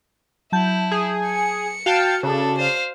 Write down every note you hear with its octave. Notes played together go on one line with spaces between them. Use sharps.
F#3 E4 A5 G6
G#4
C#7
F#4 F5 G5 A5
C#3 D4 A4
C5 F5